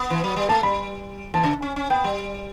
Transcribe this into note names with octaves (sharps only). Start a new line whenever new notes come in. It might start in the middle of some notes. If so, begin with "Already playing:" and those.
Already playing: B3
E3
F#3
G3
A3 A5
G3 B5
E3 A5
C#3
C#4
C#4
B3 G5
G3